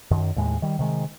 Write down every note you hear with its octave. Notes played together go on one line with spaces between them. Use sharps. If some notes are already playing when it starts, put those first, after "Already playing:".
F#2 D#3
D#2 A2 G#3
D#3 G3
C3 D#3 G#3